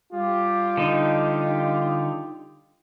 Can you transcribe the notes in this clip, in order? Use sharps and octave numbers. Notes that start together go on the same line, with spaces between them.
G3 F4 G4
D3 D#4